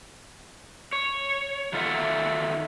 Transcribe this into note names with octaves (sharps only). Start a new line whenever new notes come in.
C#5
D#3 F4 A4 C5 E5 F#5